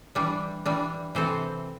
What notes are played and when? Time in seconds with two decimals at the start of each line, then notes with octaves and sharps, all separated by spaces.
0.15 E3 G3 D4
0.65 E3 G3 D4
1.15 C3 E3 C4 A4 C5